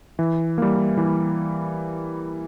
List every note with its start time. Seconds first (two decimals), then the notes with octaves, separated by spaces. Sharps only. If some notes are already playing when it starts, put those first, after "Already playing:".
0.19 E3
0.58 G3 A#3
0.97 E3